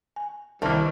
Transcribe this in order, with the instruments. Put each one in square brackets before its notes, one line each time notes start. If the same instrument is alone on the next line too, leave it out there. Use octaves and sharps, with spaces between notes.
[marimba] G#5
[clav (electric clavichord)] C2 A#3 [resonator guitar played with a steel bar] D#3 [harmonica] E3 G3 [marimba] A5